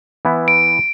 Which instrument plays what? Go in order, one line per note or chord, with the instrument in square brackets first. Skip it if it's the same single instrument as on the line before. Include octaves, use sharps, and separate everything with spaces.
[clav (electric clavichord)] E3 B3 E4
[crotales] D7